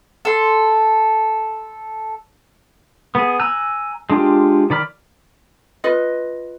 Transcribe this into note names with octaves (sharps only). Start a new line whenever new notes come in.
A4 C6
B3 G#4
G#5 A#5 E6 F#6
G#3 D4 F4 G4
D#3 D5 B5 F6
F4 B4 D#5